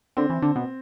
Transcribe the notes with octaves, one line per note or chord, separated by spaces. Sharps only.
D3 C4
E3
D3
B2